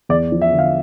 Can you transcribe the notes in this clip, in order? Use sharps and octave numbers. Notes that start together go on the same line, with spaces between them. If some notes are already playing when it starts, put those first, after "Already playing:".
E2 D5
F3
E5
D3
F5